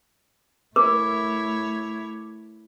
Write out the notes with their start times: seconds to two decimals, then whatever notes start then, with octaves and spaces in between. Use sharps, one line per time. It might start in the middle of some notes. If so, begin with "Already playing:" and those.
0.76 A3 E4 A#4 C#5 D6